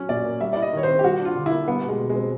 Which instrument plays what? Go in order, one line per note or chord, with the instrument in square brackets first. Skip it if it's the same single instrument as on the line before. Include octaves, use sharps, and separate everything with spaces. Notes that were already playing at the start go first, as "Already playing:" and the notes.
Already playing: [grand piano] F#3 C#4
[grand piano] A#2 [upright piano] D5
[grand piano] A#3
[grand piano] G3 [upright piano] E5
[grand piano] E4 [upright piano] D5
[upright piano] D#5
[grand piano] D#3 [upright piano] C#5
[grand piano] C4 [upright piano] C5
[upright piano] G4
[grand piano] G3 [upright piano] F#4
[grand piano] D4
[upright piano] F4
[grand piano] D3
[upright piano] E4
[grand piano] A#3
[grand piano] G3 [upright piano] B3
[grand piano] B2
[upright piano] G#3
[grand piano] B2
[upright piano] G#3
[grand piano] C4